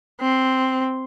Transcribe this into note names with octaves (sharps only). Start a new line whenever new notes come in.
C4